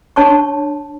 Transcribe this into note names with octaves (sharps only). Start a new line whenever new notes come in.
D4 C#5 A5 C6 C#6